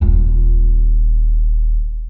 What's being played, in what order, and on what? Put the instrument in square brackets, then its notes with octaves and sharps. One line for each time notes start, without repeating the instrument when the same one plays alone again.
[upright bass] D#1 F4